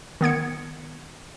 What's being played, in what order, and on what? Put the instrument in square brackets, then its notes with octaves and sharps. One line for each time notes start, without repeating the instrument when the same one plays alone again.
[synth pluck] D#3 B3 G#6 C#7